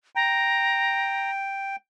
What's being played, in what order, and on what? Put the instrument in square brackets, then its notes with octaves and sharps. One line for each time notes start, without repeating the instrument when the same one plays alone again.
[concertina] G5 [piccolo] A#5